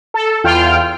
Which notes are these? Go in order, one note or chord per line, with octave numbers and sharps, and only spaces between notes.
A4
E2 F4 G5 F6